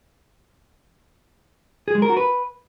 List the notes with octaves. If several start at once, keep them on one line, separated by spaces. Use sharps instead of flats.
G#4
G#3
A#4
F#4
B4